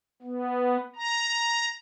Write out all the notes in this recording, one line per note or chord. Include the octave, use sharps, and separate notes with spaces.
B3
A#5